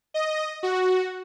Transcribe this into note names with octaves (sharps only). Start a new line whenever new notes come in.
D#5
F#4